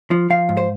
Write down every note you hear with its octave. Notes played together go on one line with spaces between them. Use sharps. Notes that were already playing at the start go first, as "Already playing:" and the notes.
F3
F3 F5
G#2
C5